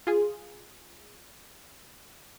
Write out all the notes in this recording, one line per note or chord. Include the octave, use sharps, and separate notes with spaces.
F4 G#4